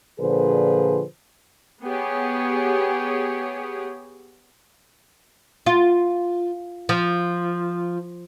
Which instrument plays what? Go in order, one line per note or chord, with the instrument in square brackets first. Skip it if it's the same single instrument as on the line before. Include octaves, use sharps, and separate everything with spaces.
[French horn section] A#2 D3 F3 G#4 B4 C5
[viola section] B3 G4 G#4 C#5
[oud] F4
F3